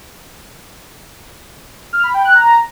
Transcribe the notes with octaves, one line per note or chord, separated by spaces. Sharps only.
F6
B5
G5
F#6
A#5